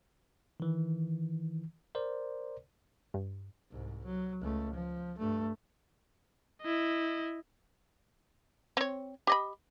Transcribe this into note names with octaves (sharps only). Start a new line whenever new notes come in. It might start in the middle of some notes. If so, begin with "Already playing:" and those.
D#3 E3
A#4 C5 D5
G2
C2 G#2
F#3
C#2 A3
F3
G2 A3
E4 D#5
C4 C#5
G4 D#5 B5